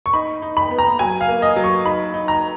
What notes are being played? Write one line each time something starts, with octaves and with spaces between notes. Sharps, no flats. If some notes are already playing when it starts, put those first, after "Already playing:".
C#6
D#4 B5
D#4
B5
B3
A#5
F#3 G#5
F5
A#3
D#5
F#3
C#6
D#4 B5
D#4
A#5